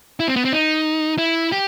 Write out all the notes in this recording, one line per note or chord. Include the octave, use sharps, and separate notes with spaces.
E4
C4
B3
C4
D#4
E4
G4